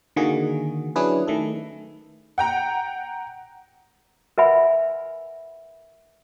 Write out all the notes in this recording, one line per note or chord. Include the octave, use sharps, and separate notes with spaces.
D3 D#3 A#3 F#4 G#4
F#3 C#4 D4 E4 G#4 B4
D#3 A3 A4
F#5 G5 A#5
A#4 B4 E5 F#5 G#5 B5